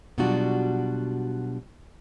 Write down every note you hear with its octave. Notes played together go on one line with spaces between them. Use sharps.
B2 F#3 G3 D4 F4 F#4